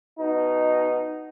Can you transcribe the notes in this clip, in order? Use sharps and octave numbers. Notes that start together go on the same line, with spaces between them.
B2 D#4